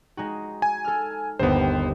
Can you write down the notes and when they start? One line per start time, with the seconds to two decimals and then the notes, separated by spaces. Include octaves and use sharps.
0.17 G#3 D#4 F#4
0.62 G#5
0.85 A4 F6
1.39 G1 D#2 B3 C5